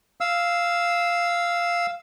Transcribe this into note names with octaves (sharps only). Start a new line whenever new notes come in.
F5 E6